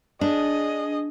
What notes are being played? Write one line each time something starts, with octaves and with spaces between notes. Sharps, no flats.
D4 G#4 D#5